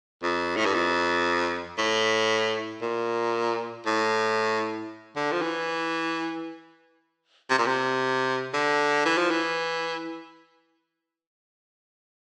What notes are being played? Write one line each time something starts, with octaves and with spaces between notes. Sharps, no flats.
F2
A2
G2
F2
A2
A#2
A2
D3
F3
E3
C3
A#2
C3
D3
E3
F3
E3